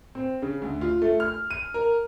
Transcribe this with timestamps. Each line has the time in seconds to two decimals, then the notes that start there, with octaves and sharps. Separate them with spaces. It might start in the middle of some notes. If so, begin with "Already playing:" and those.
0.15 C4
0.42 C#3
0.62 D2
0.81 F4
1.02 A3
1.20 F6
1.50 D#7
1.74 A#4